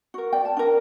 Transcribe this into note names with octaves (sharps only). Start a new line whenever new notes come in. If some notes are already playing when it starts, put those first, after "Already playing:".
F#4 A#4
D5 G5
A5
D4 A#4